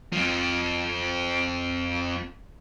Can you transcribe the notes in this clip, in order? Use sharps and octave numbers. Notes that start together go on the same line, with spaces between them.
F2 F3